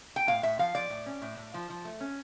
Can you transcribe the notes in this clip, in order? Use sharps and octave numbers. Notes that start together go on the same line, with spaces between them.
G5
A2 F5
A2 E5
F3 F5
F3 D5
A2
C#4
A2
A2
F3
F3
A3
C#4